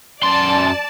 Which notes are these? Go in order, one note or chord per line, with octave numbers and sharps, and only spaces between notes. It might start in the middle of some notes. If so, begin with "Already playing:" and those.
F#2 D5 A5 C6